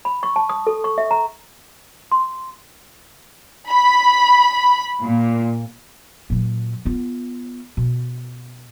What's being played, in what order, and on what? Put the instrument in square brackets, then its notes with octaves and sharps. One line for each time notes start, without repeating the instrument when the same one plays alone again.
[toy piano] B5
C#6
A5
D#6
A4
C#6
E5
A#5
C6
[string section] B5
A#2
[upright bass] A#2 F#3
B3 F4
B2